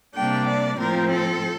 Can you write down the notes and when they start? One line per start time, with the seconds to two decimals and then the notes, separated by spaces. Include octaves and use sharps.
0.15 C3 G3 A#3 D4 G5
0.47 D5
0.78 A2 F3 C4 A#4
1.10 A4